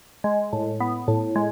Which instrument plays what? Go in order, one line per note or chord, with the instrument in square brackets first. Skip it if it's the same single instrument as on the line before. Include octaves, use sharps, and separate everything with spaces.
[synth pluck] G#3
A2
B3
A2
G#3